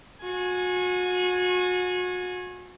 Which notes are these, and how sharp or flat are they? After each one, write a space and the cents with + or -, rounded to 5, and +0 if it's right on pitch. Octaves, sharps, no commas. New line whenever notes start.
F#4 -35 G#5 +0